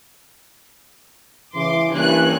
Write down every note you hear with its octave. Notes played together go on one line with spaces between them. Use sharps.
C#3 E3 C6 D6
G2 E3 A#3 C#4 G#5 F#6